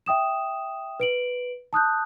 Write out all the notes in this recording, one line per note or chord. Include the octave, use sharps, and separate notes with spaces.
E5 G5 D#6 E7
B4 D7 F#7
A5 D#6 F#6 G6